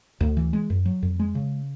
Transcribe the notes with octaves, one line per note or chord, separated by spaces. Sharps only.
D2
E3
G#3
F#2
F#3
F2
G#3
C#3